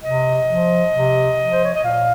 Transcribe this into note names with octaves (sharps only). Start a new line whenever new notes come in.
C3 D#5
F3
C3
F3
C5
C#5
D#5
A#2 F5